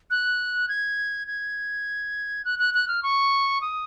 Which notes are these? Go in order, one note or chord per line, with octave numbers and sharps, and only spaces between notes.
F#6
G#6
G#6
F#6
F#6
F#6
F6
C#6
D#6